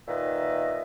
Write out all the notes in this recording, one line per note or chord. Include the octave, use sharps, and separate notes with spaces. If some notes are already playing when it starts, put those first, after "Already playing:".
A#2 D#3 B4 D#5 E5